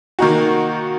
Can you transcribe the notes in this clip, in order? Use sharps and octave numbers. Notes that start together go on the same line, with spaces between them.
D#3 A#3 D#4 F#4